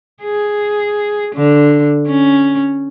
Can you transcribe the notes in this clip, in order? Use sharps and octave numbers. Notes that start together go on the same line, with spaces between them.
G#4
D3
C#4